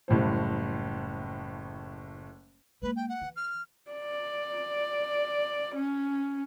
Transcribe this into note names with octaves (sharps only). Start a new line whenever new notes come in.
F#1 A2 G3 C5
G#3 A#3 B4
G5
F#5
E3
F6
D5
C#4